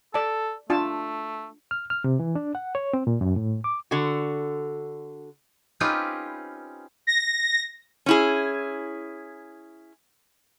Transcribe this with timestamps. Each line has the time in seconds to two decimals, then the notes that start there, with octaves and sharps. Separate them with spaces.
0.14 A4 D5 A5
0.70 A3 D4 F4 A5
1.71 F6
1.90 F6
2.04 C3
2.20 E3
2.35 D4
2.55 F#5
2.75 C#5
2.93 C4
3.07 A#2
3.21 F#2
3.36 A2
3.64 D6
3.91 D3 F#4
5.80 C4 C#4 D#4 F4 G4 B4
7.07 A#6
8.06 C#4 E4 G#4